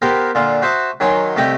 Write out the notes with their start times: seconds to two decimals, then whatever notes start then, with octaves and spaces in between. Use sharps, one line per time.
0.02 B3 G4 A#4 C5
0.35 A#2 D3 F4
0.62 F#4 C5 E5 A5 D#6
1.00 D#3 F#3 C#5 G#5 C6
1.36 C2 A3 G4 D#5 G5